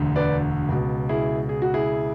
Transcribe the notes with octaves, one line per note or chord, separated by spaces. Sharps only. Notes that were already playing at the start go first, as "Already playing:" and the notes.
Already playing: E1 D2 D3
B4 D5
C#2 B2
E4 G#4
G#4
F#4
E4 G#4